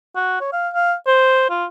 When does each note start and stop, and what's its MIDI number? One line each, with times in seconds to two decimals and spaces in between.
0.16 0.38 66
0.41 0.51 73
0.52 0.69 77
0.73 0.94 77
1.07 1.49 72
1.50 1.65 65